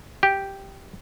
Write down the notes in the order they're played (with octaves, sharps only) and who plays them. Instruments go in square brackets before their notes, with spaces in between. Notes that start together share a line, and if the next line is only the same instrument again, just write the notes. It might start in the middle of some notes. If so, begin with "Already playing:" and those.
[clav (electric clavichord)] G4